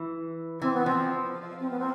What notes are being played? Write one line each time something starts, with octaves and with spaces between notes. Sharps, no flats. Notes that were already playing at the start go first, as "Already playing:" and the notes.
Already playing: E3
E3 C4
B3
F3 C4
C4
B3
C4